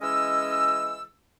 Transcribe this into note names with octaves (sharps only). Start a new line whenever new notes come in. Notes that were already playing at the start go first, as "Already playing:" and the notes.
E3 G#3 C#4 D#5 E6